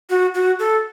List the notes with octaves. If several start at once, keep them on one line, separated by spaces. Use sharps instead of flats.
F#4
F#4
A4